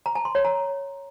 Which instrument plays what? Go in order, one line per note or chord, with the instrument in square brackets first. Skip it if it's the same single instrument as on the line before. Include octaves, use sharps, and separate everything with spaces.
[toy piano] A#5
A5
C6
C#5
A#5